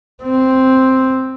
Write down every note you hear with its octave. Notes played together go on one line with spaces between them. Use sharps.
C4